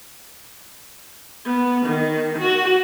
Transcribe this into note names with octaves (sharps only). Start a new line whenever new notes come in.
B3
D#3
F#4